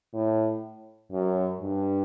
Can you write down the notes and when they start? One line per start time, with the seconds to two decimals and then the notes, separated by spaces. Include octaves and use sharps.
0.13 A2
1.12 F#2
1.60 G2